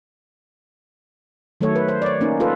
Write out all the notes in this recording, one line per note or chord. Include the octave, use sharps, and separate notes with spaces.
D#3 F#3 A3 A4 C#5
B4
C5
C#5 D5
A#3 C#4 D#4
F4 A4 B4